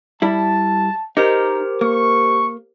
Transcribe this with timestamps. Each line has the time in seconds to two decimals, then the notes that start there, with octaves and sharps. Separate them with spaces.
0.22 G3 E4 A5
1.17 D#4 G4 A#4 C5 A#5
1.81 A#3 C#6